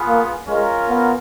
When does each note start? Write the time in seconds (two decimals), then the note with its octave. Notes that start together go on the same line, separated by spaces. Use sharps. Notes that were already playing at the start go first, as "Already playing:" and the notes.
Already playing: B3 F4 G#4 B4 F5
0.08 A#3
0.48 G#3 C#4 F4 A#4
0.89 B3